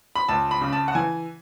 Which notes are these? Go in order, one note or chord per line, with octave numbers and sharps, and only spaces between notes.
B5
C#2 A5
B5
C#3
A5
F#5
E3 G#5